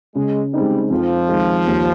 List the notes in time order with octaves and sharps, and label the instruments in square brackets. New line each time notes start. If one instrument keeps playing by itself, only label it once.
[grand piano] C#3 [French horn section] G#3
[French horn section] G3 [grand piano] G#3 C4 D#4
[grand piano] F2 [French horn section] F3
[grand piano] D#3 G#3
D#2